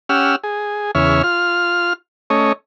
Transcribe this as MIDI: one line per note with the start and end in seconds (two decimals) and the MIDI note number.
0.09 0.36 61
0.09 0.36 67
0.09 0.36 78
0.09 0.36 88
0.09 0.36 89
0.44 0.91 68
0.95 1.22 40
0.95 1.22 49
0.95 1.22 73
0.95 1.22 76
0.95 1.22 89
1.24 1.93 65
1.24 1.93 89
2.30 2.53 57
2.30 2.53 61
2.30 2.53 73
2.30 2.53 75